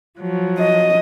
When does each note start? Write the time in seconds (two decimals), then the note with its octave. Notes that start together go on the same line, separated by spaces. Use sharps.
0.18 F3 F#3
0.59 D#5